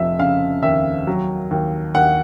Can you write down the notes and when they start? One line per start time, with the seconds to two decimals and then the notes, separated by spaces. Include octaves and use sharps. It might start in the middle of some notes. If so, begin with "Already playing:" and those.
Already playing: F1 F3 E5
0.19 C#3 F5
0.63 D#2 E5
1.07 F#3
1.51 D#2
1.95 D#2 F#5